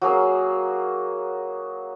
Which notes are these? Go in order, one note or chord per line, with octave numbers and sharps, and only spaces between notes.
F#3 A#3 G#4 F5